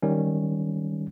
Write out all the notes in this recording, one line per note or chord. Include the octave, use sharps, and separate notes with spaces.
D#3 G3 C#4